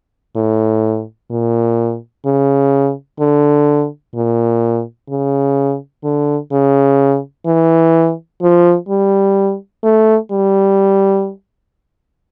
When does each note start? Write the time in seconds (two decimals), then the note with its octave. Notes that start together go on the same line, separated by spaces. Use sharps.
0.36 A2
1.31 A#2
2.26 C#3
3.20 D3
4.15 A#2
5.10 C#3
6.04 D3
6.52 C#3
7.46 E3
8.42 F3
8.89 G3
9.83 A3
10.31 G3